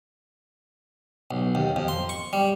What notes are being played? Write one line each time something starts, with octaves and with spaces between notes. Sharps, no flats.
B1
D#2
F2
C6
C#6
G3